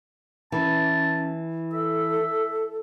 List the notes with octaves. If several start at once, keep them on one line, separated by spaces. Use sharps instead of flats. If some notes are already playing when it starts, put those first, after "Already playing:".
E3 C#4 A5
A4 E5